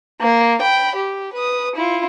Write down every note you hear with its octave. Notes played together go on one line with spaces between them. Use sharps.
A#3
G5 B5
G4
B4 D#6
E4 F4